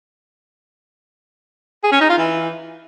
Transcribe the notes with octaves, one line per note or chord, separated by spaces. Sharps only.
G#4
C#4
D#4
F4
E3